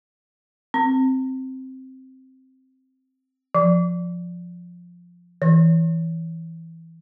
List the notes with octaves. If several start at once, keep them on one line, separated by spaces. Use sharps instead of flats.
C4
F3
E3